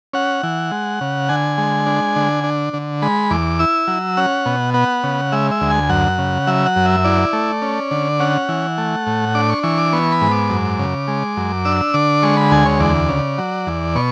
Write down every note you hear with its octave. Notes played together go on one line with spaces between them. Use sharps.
C#4 F#5
E3
G#3
C#3
D3 G#5
G#3
D4
D3
D4
D3
G#3 B5
E2 D6
E4 E6
F#3
C#4 F#5
B2
B3 F#5
C#3
G#3 E5
E5
D2
G#5
F#2 F#5
C#3
F#3 E5
F#5
F#2
E5
E4 D5
A3
C#4
D3
C#4 F#5
E3
A3
A2
D4 D6
C#6
E3 C#6
D6
B3 C#6
B5
G#2
D6
F#2
C#3
G#3
F#2
D4 E6
D3 D6
G#3 C#6
B5
D2 G#5
C#5
E2 D5
C#3
F#3
E2
B2 C#6